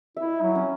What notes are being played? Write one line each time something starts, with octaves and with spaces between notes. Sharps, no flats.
E4 E5
F#3
C#4